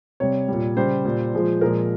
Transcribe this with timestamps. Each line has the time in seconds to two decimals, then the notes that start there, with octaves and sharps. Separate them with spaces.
0.20 C3 G3 C#5
0.48 A#2 G3
0.76 C#3 G3 C5
1.05 A#2 G3
1.33 A#2 F3 G#3
1.61 A#2 F3 G#3 A#4